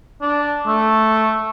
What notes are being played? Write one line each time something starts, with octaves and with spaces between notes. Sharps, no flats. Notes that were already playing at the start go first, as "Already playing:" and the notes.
D4
A3